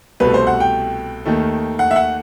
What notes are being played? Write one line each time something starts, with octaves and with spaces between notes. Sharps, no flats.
C2 B2 A3 B4
C5
F#5
G5
D#2 D#3 A3
F#5
E5
F#5